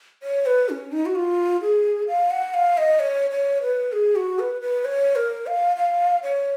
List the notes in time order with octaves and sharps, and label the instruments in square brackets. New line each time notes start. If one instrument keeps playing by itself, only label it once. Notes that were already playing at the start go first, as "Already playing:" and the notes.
[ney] C#5
B4
C#4
D#4
F#4
F4
G#4
F5
F#5
F5
D#5
C#5
C#5
B4
G#4
F#4
B4
B4
C#5
A#4
F5
F5
C#5